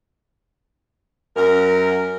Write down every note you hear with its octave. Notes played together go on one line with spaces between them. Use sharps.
F#2 A#4